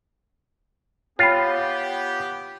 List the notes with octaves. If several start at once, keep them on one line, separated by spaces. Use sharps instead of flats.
B3 F4 G4 C#5 G5 B5